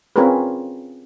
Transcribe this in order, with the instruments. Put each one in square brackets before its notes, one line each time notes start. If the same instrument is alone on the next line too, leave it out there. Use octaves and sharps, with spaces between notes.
[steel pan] C4 C#4 F4 G#4 A#4 B4